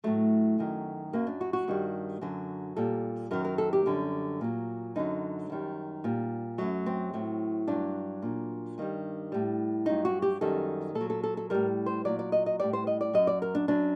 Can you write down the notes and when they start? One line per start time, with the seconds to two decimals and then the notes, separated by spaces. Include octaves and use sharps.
0.04 A2 F#3 A3
0.58 F#2 D#3 F#3
1.13 F#2 F#3 A#3
1.27 D4
1.41 F#4
1.53 F#4
1.68 G2 D#3 G3
2.21 F#2 D3 F#3
2.76 A#2 G3 A4
3.31 F#2 D#3 F#3 A#4
3.45 A#4
3.58 A4
3.73 G4
3.86 F#2 D3 G3
4.41 A#2 F#3
4.96 F#2 D3 F#3 D#4
5.50 F#2 D#3 G3
6.04 A#2 G3
6.58 F#2 F#3 A3
6.86 C4
7.13 A2 F#3
7.68 G2 F#3 D4
8.23 A#2 F#3
8.78 G2 D#3 G3
9.32 A2 G3
9.86 G2 F#3 D#4
10.05 F#4
10.22 G4
10.41 F#2 D#3 G3 A4
10.95 A#2 A4
11.01 F#3
11.10 A4
11.24 A4
11.37 A4
11.50 A2 G3 A#4
11.86 C5
12.05 A#2 F#3 D5
12.19 D5
12.32 D#5
12.46 D#5
12.59 A2 G3 D5
12.73 C5
12.87 D#5
13.01 D5
13.14 F#2 F#3 D#5
13.27 D5
13.42 A#4
13.55 D4
13.68 F#2 F#3 D4